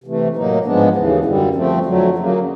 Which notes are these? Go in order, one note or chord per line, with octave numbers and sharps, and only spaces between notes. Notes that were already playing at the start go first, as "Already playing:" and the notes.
C3 E3 A3
A2 F#3 A#3 D#4
G#2 F3 G#3 B3 D4
D#2 C#3 E3
F#2 D3 G3
F3 A3 C4
F2 D3 F#3 A3
C#3 F#3 A#3